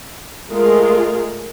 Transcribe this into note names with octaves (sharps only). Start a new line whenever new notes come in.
G#3 A3 F4 G#4 A#4